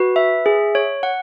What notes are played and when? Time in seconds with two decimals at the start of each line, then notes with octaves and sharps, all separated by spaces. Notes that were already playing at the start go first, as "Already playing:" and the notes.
Already playing: F#4 B4
0.16 E5
0.46 G#4
0.75 C#5
1.03 F#5